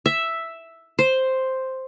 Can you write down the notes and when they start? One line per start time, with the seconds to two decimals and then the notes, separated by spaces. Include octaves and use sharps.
0.06 E5
0.99 C5